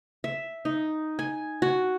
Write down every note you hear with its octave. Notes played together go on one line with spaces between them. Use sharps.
E5
D#4
G#5
F#4